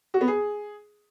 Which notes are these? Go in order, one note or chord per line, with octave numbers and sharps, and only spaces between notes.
F#4
B3
G#4